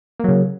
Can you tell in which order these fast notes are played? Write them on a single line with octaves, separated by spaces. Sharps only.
A#3 F#3 C#3